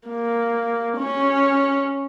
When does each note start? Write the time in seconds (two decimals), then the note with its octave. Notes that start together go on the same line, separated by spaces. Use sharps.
0.08 A#3
0.97 C#4